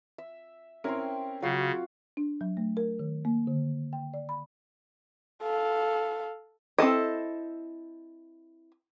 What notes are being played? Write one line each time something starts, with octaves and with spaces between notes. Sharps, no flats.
E5
C4 C#4 E4 A#4 G5 C6
C#3 F#3 F4 F#4 C7
D4
F#3
A3
A#4
D#3
A#3
D3
G5
D5
B5
A4 F5
C4 E4 A4 D#5